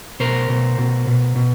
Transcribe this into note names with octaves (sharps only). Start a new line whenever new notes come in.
B2 A#4 C5
B2
B2
B2
B2